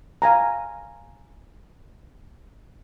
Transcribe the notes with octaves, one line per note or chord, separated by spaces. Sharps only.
F5 G#5 A#5